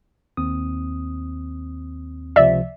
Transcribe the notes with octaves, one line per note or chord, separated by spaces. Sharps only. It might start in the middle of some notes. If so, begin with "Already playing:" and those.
D#2 C4 D#6
C#2 C3 F3 D5 E5